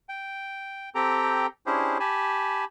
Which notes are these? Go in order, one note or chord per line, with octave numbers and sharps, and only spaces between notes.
G5
C4 G4 A4 G5 A#5
C#4 D4 E4 G4 G#4 C5
G4 G#5 A5 B5